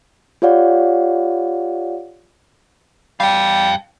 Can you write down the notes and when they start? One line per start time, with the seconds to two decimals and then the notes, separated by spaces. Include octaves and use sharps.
0.42 F4 G4 C#5 D5 F5 F#5
3.20 G3 F5 G5